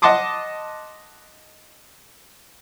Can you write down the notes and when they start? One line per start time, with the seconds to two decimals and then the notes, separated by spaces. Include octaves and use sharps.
0.02 D#5 F#5 A5 C6 D6 D#6